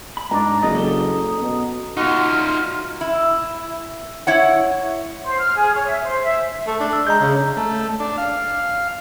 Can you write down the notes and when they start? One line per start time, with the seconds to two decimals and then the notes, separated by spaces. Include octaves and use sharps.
0.17 B5
0.31 G#2 D4 A#5
0.62 F#1 F4 D5 D#5 D#6
0.75 C#4 A4
1.41 B2
1.97 D#4 F4 F#4 C6 F6
3.01 E4
4.27 E4 C#5 F#5
5.24 C5
5.39 F6
5.56 G#4
5.74 C#5
5.88 E5
6.04 C5
6.24 E5
6.67 A3
6.80 D4
6.93 E6
7.07 G#3 A#5 G6
7.20 C#3
7.57 A3
8.00 D4
8.18 F5